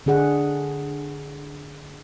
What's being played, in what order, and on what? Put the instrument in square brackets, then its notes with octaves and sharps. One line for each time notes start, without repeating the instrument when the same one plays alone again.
[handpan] D3 D4 G#4 F#5